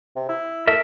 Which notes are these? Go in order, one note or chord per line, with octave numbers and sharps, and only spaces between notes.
C3
E4
A3 A#4 E5